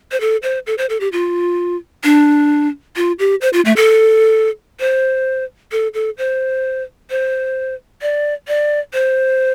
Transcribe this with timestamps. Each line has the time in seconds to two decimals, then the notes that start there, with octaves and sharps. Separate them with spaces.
0.12 C5
0.21 A4
0.43 C5
0.67 A4
0.78 C5
0.89 A4
1.00 G4
1.12 F4
2.04 D4
2.96 F4
3.19 G4
3.41 C5
3.53 F4
3.65 A3
3.76 A4
4.80 C5
5.72 A4
5.94 A4
6.18 C5
7.10 C5
8.02 D5
8.48 D5
8.93 C5